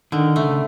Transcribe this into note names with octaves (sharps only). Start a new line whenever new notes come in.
D3 D#3
C#3 A3